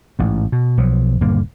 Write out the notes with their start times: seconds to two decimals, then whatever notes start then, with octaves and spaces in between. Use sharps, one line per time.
0.19 A1 G#2
0.52 B2
0.77 B1 F3 F#3
1.21 D#1 G2 D3 A#3